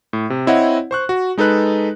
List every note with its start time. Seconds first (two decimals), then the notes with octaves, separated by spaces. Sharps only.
0.13 A2
0.30 C3
0.47 C4 E4 C#5 D#5 F#5
0.91 C5 C#6 F#6
1.09 F#4
1.38 G#3 D#4 A4 B4 F#6